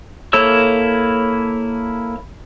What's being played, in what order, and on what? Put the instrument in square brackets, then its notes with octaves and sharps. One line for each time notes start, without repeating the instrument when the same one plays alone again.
[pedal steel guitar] A#3 E4 A4 C#5 E6